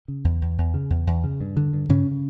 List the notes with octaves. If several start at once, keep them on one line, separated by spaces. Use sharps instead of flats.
C#3
E2
E2
E2
C#3
E2
E2
C#3
G2
D3
G2
G2 C#3 C#4